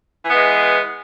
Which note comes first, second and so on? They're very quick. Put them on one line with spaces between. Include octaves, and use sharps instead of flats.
E3 B3 G#3